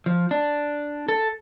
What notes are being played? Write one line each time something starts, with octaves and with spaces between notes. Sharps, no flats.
F3
D4
A4